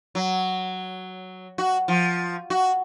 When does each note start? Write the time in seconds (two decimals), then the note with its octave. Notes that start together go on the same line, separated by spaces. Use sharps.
0.15 F#3
1.58 F#4
1.88 F3
2.50 F#4